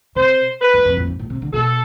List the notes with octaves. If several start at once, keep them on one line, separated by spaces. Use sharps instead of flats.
C3 C5
B4
G#2
F2
A2
G#2
A2
C3
D3
B2 A4